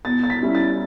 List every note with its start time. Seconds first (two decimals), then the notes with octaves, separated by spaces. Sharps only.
0.05 B2 A6
0.24 A6
0.30 B6
0.42 G3 C#4 E4
0.55 A6